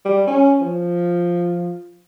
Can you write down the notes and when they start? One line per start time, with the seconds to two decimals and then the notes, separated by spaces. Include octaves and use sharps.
0.05 G3
0.27 C#4
0.61 F3